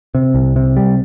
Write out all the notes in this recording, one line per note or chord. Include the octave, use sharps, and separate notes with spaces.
C3
C2
C3
G3